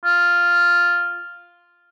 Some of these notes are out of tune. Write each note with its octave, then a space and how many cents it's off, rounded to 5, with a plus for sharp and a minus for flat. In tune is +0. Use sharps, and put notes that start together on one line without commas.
F4 +0